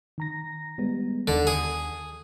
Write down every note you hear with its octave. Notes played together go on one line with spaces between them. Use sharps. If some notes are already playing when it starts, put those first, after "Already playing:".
D#3 A#5 A#6
G3 G#3 B3
D#2 D3 D#3
G#4